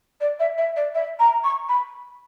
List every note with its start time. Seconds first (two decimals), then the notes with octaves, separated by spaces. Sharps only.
0.20 D5
0.39 E5
0.57 E5
0.76 D5
0.94 E5
1.19 A#5
1.44 C#6
1.68 B5